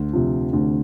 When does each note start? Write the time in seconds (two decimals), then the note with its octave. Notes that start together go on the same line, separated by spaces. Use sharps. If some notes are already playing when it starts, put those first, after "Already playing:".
Already playing: D2
0.13 C3 F3
0.53 D2